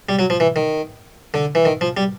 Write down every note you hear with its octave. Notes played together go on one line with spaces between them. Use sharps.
G3
F#3
F3
E3
D#3
D3
E3
D#3
F3
G3